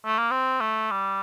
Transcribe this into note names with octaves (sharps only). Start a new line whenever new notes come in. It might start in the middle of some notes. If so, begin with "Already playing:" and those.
A3
A#3
C4
A3
G3